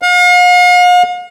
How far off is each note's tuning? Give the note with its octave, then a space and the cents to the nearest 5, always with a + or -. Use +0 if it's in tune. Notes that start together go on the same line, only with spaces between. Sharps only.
F5 +45